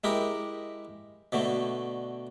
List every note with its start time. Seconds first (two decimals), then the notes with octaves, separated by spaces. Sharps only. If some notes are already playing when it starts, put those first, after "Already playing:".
0.04 G#3 E4 G4 A#4
1.32 B2 D3 A3